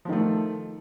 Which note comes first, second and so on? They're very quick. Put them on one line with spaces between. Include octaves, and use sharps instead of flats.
F3 D#3 A3